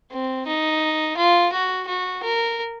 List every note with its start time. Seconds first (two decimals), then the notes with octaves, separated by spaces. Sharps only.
0.11 C4
0.47 D#4
1.17 F4
1.52 F#4
1.88 F#4
2.23 A#4